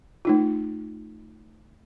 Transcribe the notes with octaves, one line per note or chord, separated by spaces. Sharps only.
A3 D#4 F4